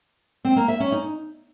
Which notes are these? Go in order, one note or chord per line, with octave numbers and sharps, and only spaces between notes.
C4
A#3
E5
C#4
D#4